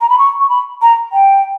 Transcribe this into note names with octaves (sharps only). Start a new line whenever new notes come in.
A#5
B5
C#6
C#6
B5
A#5
G5